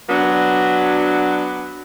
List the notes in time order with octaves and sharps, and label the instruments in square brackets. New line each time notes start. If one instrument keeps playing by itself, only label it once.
[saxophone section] F#3 B3 D4